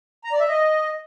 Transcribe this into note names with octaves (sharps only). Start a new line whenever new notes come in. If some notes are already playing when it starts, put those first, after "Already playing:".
A#5
D5
E5
D#5